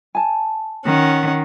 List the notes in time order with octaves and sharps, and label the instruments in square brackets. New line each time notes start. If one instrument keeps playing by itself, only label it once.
[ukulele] G#5 A5
[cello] D#3 [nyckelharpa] C#4 F#5